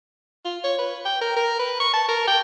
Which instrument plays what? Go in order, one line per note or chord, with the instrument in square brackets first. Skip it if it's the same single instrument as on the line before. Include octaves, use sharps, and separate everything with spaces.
[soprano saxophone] F4
C#5
B4
G5
A#4
A#4
B4
C#6
A5
A#4
G5